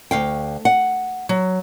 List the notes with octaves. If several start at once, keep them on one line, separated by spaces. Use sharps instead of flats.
D2 F5 G5
F#5
F#3